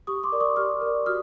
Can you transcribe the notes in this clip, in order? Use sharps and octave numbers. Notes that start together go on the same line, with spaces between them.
G4 C#6 D#6
C6 D6
A#4 D5
C#6 D#6
G4 D#6 F6
A#4 D5
F#4 D#6 F6